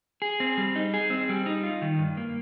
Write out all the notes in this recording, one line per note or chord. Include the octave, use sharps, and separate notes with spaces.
G#4
C4
G3
D#4
G#4
C4
G3
D#4
F4
D#3
G2
A#3